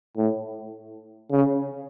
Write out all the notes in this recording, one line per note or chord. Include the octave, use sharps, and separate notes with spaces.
A2
C#3